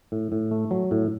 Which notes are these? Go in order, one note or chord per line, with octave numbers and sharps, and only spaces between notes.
A2
A2
A3
F#3
A2